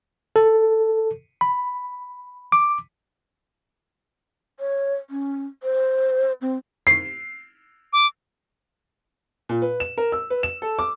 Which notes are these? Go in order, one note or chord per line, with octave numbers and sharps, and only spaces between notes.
A4
B5
D6
C#5
C#4
C5
C4
C7
D6
A#2
B4
E7
A#4
E6
B4
E7
A4
D6